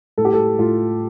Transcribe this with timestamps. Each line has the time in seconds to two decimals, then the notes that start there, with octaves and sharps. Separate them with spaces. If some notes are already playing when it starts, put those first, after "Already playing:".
0.18 A2 A4
0.25 G4
0.34 A4
0.59 A2 F4